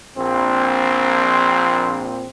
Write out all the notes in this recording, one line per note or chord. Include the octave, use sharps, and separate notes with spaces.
A#1 C4